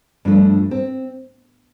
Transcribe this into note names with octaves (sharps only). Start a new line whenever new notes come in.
G2 F3 A3 D4
C4